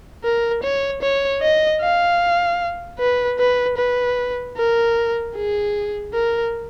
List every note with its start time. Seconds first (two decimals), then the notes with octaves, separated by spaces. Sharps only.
0.24 A#4
0.63 C#5
1.02 C#5
1.42 D#5
1.81 F5
2.99 B4
3.39 B4
3.78 B4
4.57 A#4
5.36 G#4
6.14 A#4